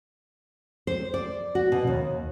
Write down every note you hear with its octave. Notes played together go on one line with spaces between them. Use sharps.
C5
D5
F#4
B2
D#2